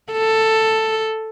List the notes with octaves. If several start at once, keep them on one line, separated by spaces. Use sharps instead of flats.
A4